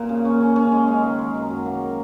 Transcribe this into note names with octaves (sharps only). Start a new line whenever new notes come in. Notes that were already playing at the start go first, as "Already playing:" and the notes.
Already playing: A#2 A#3 F#4
C#3
C#4
C#4
C#4
G#3
G#3
D#3
G#3
F#2
F#3
A#3